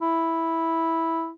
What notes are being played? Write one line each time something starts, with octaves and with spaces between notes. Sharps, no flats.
E4